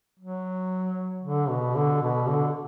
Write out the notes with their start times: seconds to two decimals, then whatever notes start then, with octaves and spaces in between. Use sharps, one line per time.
0.19 F#3
1.24 D3
1.49 B2
1.76 D3
2.02 B2
2.27 D3